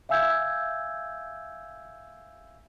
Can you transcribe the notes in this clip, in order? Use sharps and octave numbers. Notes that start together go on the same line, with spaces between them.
E5 F5 G#5 E6 G6 G#6